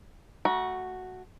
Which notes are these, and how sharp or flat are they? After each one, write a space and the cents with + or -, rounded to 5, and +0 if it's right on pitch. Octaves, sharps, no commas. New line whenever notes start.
A3 +0 F#4 +0 A#5 +40